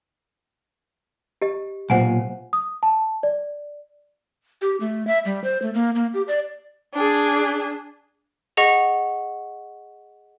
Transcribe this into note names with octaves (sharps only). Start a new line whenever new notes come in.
G4 D#5
B1 A#2 C5 F#5 G#5
D#6
A5
D5
G4
A3
E5
G3
C5
A3
A#3
A#3
G4
D5
D4 G#4
G#4 D#5 F#5 C#6